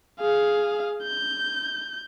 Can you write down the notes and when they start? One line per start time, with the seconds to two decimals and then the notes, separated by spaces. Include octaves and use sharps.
0.20 G#4 F5
1.03 G6